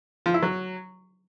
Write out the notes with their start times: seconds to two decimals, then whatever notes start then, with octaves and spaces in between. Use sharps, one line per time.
0.26 F3
0.34 E4
0.43 F#3